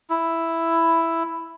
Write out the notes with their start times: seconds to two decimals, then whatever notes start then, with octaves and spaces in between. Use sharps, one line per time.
0.10 E4